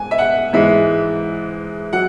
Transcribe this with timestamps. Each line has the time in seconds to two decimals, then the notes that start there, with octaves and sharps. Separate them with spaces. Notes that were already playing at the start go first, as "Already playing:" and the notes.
Already playing: G#2 G#5
0.11 E5
0.18 F#5
0.53 G#2 E3 G#3 E5
1.93 F#3 F#5